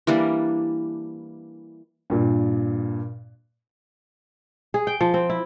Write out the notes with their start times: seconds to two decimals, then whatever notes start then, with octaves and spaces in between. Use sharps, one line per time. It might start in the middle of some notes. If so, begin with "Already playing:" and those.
0.07 E3 G3 A#3 D4
2.10 G2 A#2
4.74 G#4
4.87 G5
5.01 F3
5.14 C4
5.30 E4